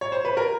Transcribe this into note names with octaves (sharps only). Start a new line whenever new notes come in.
C#5
C5
B4
A#4